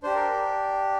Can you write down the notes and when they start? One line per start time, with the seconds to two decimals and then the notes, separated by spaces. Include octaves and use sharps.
0.03 D4 G4 C5
0.16 A#4